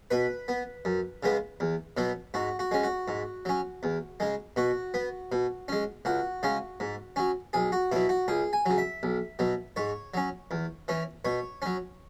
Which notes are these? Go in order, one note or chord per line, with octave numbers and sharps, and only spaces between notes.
B2 B4
B3
F#2
C#3 G#3 B3
E2
B2 F#3 B3
G#2 F#4
F#4
G#3 C#4
F#4
G#2
F#3 C#4
E2
C#3 G#3
B2 F#4
B3
B2
G#3 C#4
C#2 F#4
C#3 G#3 C#4
G#2
F#3 C#4
B1 G#4
F#4
B2 F#3 E4
F#4
C#2 G#4
G#5
C#3 F#3
E5
B1
B2 F#3
G#2 C#5
F#3 C#4
E2
E3 C#4
B2 C#5
F#3 C#4